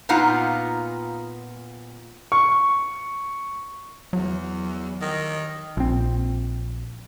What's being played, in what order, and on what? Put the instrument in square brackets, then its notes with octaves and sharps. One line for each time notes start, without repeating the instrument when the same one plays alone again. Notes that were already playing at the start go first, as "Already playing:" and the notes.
[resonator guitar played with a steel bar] A#2 B3 D#4 F4 F#5 A#5
[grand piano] C#6
[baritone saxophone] E2 [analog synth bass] F#3
[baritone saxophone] D#3
[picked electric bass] A#1 C4